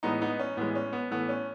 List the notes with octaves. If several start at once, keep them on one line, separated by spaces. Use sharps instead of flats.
A2 E3 G#3 B3 D#4
B3 D#4
C#4
A2 E3 G#3 B3
C#4
B3
A2 E3 A3 B3
C#4